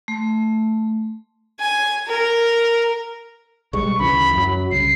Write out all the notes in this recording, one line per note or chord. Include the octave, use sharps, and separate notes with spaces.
A3
G#5
A#4
B1 G3 G#3 C#6
D2 C#3 E3 B5
F#2 F#3
C2 C#3 C7